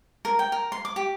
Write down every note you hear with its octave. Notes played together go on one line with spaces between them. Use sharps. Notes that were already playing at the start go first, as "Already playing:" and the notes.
A#4
G5
A#4
C6
D6
G4